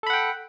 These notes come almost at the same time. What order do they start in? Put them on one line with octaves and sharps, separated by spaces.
A4 B5 F#5 G5